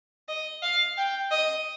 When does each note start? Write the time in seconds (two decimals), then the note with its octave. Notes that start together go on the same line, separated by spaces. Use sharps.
0.28 D#5
0.62 F5
0.97 G5
1.31 D#5